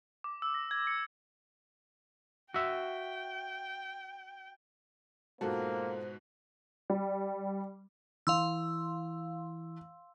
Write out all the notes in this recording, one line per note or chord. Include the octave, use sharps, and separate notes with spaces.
D6
E6
A#6
G#6
C#7
F#4 E5 G5
G#2 B2 A#3 F4 F#4 A4 C5 A5
G3
E3 F5 C6 E6